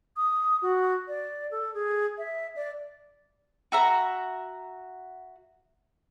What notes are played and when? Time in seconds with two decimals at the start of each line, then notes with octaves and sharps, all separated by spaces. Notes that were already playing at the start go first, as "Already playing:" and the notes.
0.17 D#6
0.62 F#4
1.08 D5
1.51 A4
1.74 G#4
2.18 E5
2.56 D5
3.72 F#4 E5 A#5